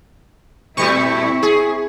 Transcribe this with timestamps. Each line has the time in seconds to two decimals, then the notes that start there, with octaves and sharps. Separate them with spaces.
0.77 A#2 G3 A3 C4 E4 C#6
1.43 G#4